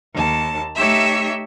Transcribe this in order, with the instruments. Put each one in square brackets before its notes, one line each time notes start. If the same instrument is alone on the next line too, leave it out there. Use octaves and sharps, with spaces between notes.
[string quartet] D#2 A5
A3 D#4 G4 C#5 E5 E6